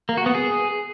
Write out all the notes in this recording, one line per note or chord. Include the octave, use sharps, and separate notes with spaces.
A#3
F#4
B3
G#4